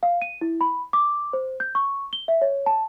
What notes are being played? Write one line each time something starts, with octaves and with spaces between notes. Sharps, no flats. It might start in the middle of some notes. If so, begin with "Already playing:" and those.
F5
D#7
E4
B5
D6
C5
G6
C#6
G7
E5
C#5
A5